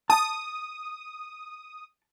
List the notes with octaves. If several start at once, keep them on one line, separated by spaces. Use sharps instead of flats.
A5 D#6